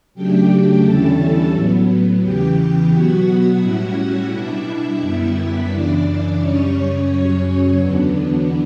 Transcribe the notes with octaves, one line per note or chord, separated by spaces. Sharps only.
C#3 F#3 A3 D4 G4 G5
E2 D3 G3 C#4 E4 A4 A5
A2 F#3 B3
E2 C#3 E3 G4 G5
B2 F#3 B3 F#4 F#5
A2 G3 C#4 E4
B2 G3 D4 E4 E5
F#2 D3 G3 B3
F#2 C#3 E3 D4 D5
F#2 C#3 G3 C#4 C#5
F#2 C#3 F#3
E2 D3 F#3 B3 D4